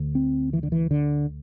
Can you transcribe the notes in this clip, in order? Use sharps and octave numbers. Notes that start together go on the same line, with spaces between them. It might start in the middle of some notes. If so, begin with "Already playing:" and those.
Already playing: D2 D3
C4
E3
D3
E3
D3